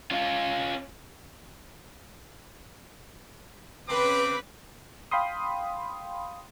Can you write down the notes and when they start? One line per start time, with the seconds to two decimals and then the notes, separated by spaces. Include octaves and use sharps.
0.11 C#4 F4
3.89 C#3 C4 B4 D6 B6
5.11 F5 G5 B5 C6 D#6